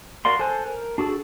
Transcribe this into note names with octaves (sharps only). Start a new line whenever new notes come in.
F#4 A#4 D5 F5 C6
A4 C5 G#5 F#6
A#4
D4 F#4 G#4 A4